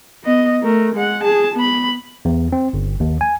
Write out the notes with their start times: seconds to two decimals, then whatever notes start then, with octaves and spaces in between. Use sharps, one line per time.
0.24 B3 D#5
0.63 A3 A#4
0.95 G#3 F#5
1.23 G#4 A5
1.56 B3 B5
2.25 E2
2.52 C4
2.74 G1
3.00 D#2
3.21 G#5